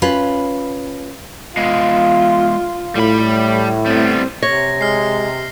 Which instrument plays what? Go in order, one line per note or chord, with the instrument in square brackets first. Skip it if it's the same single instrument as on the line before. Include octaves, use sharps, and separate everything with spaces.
[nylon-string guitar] C#4 F4 B4
[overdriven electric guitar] G#3 B3 [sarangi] F4
[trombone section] A2 [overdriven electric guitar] G3 B5
[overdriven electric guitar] G3 B3 [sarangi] C4
[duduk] C3 [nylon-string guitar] C#5 [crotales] A#6
[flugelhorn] G#3 [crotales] F6 C7